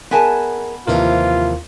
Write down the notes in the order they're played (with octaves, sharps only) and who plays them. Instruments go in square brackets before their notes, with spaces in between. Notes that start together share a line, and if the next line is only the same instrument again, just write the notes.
[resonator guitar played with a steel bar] B3 G#5 A5 [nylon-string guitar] G#4 A#4 D#5
[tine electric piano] D#2 A#4 [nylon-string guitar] C3 E3 F3 [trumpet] F4